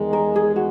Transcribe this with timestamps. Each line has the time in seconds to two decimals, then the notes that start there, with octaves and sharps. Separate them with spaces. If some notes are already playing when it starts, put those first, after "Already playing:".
Already playing: E2 D#3 G#3
0.13 A#4
0.36 G#4
0.56 F#4